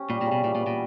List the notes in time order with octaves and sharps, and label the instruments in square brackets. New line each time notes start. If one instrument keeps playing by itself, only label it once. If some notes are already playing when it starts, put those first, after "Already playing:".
Already playing: [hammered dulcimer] C#4 G4
[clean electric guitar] A#2 [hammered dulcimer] G3
[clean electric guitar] A#2 [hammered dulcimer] C#3
[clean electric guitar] B2
[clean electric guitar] A#2 [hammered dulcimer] E3
[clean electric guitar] A#2
[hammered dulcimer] B3
[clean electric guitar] A#2